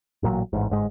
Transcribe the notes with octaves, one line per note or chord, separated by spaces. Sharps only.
A1 A#2 D#3 F#3
A1 G#2
G1 G#2 G#3